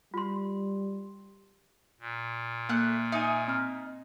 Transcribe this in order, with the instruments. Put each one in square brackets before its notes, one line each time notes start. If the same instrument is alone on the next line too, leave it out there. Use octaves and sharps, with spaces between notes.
[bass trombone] G3 [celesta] F4 C6
[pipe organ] A#2
[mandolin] A3 F#6 [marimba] A#3
[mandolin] D#4 G#5 [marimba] E5
[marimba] C4 F6